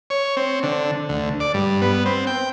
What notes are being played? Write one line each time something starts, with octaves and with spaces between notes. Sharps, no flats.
C#5
C4
D3
D2
D5
G2
B3
C4
G5